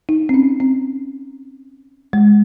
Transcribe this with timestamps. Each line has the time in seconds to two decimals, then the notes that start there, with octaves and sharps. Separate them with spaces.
0.09 D#4
0.29 C4
0.34 C#4
0.60 C4
2.13 G#3